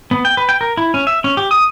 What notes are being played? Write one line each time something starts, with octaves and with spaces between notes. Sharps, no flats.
B3
G5
B4
G5
A#4
E4
C#4
E5
C#4
G4
D#6